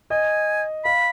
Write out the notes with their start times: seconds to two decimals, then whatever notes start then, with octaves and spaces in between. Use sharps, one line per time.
0.10 D#5 G#5
0.84 F5 B5